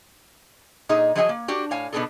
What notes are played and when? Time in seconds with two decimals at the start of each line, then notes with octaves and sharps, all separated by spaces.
0.89 A#2 D#4 G#4 D#5
1.15 F3 F#3 G#4 D#5 F#5 G#5
1.29 A#3
1.48 D4 F#4 G4
1.71 A2 C#5 F5 G#5
1.93 B2 B3 D4 D#4 G#4 A4